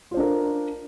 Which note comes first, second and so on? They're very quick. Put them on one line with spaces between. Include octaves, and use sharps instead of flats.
F4 C5 D4 A#4